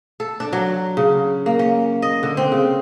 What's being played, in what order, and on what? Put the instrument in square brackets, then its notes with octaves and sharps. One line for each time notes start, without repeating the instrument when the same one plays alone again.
[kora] A4
D4
F#3
C#3
A#3
C#4
D#5
D3
C4
C#3